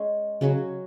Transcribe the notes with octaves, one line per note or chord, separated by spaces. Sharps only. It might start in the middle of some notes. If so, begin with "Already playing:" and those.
Already playing: G#3 C#4
C#3 F#3 C#4 F#4